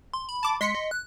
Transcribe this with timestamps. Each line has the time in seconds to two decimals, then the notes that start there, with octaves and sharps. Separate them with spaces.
0.14 C6
0.29 B5
0.43 A5 D6
0.61 G#3 C6 B6 C#7
0.75 D#5
0.91 F#6